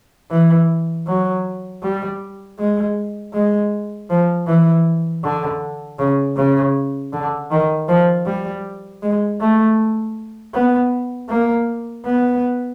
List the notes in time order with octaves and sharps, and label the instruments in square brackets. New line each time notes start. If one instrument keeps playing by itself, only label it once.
[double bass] E3
F#3
G3
G#3
G#3
F3
E3
D3
C#3
C#3
D3
D#3
F3
G3
G#3
A3
B3
A#3
B3